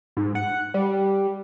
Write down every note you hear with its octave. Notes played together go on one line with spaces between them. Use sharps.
G#2
F#5
G3